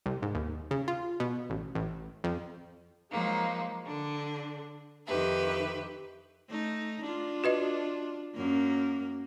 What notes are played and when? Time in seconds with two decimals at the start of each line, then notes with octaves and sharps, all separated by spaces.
0.06 C2
0.22 G#2
0.35 D#2
0.71 C#3
0.88 F4
1.20 B2
1.50 A1
1.75 A1
2.24 F2
3.10 F3 F#3 G#3 A#3 D#4
3.84 D3 D4
5.06 F2 D#3 G4 B4 E5
6.49 A3 D#4
7.04 D4 F4
7.44 F#4 B4 D#5
8.35 F#2 A#3